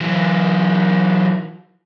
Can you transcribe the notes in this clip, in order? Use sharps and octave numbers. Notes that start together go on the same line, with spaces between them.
E3 F#3